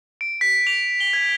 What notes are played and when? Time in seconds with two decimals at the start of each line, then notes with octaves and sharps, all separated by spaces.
0.21 D7
0.41 B6
0.67 F7
1.00 G7
1.13 G#6